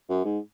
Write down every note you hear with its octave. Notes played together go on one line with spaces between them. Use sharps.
F#2
G#2